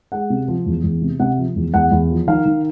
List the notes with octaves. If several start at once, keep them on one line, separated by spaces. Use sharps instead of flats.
G#3 F#5
C3
F3
E2
E2
C3
C3 F#5
F3
E2
E2 F#5
E2
F3
D#3 F5
D#3